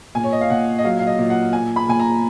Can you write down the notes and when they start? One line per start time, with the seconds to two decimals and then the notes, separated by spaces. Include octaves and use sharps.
0.15 A#2 G#5
0.24 C#5
0.32 D#5
0.41 F5
0.50 A#2 F#5
0.78 D#5
0.84 F#3 F5
0.99 F5
1.07 D#5
1.19 A#2
1.30 F#5
1.53 A#2 G#5
1.76 B5
1.88 A#2 G#5
2.00 A#5